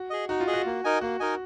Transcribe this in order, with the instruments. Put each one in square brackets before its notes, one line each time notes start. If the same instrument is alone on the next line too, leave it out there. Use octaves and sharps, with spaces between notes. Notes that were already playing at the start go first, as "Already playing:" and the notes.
Already playing: [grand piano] F#4
[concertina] G#4 D#5
[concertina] D#4 [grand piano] F#4
[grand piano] F4
[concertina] G#4 D#5
[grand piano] F#4
[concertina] A#3
D#4 A#4 D#5 G#5
[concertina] A#3 [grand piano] F#4
[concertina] D#4 A#4 D#5 G#5